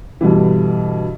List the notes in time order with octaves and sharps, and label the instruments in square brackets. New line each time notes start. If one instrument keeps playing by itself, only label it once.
[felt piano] G2 B2 D3 E3